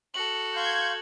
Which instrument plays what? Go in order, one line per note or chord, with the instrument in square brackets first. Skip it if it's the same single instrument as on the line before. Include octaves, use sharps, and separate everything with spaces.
[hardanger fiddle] F#4 A4 [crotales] F#7
[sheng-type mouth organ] F5 C6 C#6 [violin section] G6 G#6